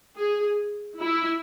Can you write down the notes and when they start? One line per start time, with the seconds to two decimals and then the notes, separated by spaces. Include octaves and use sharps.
0.18 G#4
1.00 E4